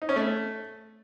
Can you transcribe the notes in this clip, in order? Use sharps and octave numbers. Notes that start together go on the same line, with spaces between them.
D#4
C#4
A3